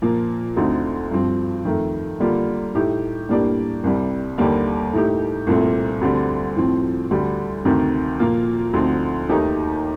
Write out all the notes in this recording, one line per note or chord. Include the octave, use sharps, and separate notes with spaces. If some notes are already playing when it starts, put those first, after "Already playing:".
A#2 F3 A#3
D2 D3 A3 C4 D#4
G2 F3 C4
F2 D#3 A3
D3 G3 A#3 F4
A2 A3 D#4 G4
A2 G3 A#3 D4 G4
C2 C3 G3
D#2 D3 G3 A#3
A2 A3 D#4 G4
C2 A#2 A3 C4
D2 D3 G3 C4
A2 F3 C4
D2 D3 G3
D2 C3 D#3
A#2 F3 A#3 F4
D2 D3 F3 C4 D#4
D#2 D#3 A3 D#4 G4